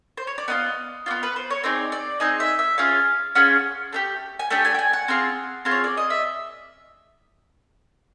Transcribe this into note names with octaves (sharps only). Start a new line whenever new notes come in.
C5
C#5
D5
B3 D4 F4 D#5
B3 D4 F4
B4
C5
C#5
C4 D#4 G#4 D5
D5
C4 D#4 G#4 D#5
E5
E5
C#4 F4 G#4 F5
C#4 F4 G#4 F#5
A3 D4 G4
G#5
A3 D4 G4 G5
G#5
G5
G#5
F#5
C4 F4 G#4
C4 F4 G#4
C#5
D5
D#5
E5